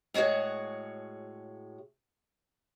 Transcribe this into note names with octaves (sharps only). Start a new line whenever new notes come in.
A2 G#3 F#4 G#4 C#5